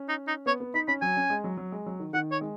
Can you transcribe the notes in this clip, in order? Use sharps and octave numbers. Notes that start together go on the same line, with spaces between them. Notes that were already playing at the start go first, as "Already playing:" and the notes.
Already playing: C#4
D#4
D#4
B3 C#5
B3
D#4 B5
C#4 B5
F#3 G#5
C#4
G#3
F#3
F#3
G#3
F#3
D#3
D#3 F#5
C#5
G#3